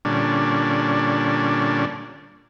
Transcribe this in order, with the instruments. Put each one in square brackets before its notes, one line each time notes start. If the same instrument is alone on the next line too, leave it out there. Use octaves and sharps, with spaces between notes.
[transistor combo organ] A#2 D3 G3 C#4 D4